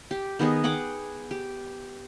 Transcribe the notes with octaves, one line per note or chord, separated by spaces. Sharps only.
G4
D#3 B3 G#4 D#5
G#4 F#5 G5 D6
G4